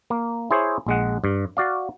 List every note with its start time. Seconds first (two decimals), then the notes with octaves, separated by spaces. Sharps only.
0.10 A#3
0.51 E4 G#4 C5 C#5
0.87 A#1 G#3 F#5
1.24 G2
1.57 F#4 D5 F5